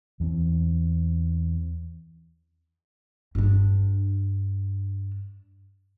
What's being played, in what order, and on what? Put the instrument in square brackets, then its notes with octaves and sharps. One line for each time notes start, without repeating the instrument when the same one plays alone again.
[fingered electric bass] E2 E3 A#3 C4
[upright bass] G2 D4